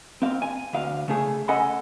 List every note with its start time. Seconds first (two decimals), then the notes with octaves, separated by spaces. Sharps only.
0.22 C4 F5
0.42 G#5
0.73 D2 F5
1.08 C#3 A3 G#4
1.48 C#4 A4 D#5 F#5 G#5 B5